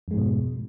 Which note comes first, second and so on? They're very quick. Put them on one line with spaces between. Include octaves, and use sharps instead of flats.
F2 G#3 G#2 B2